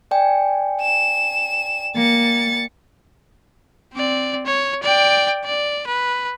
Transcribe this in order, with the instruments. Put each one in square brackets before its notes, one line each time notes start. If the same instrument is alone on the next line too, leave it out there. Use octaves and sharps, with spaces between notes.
[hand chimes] D5 G5 G#5
[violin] E7
[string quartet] A#3 [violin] A6 C#7
[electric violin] C4 D5
C#5
D5 G5
D5
B4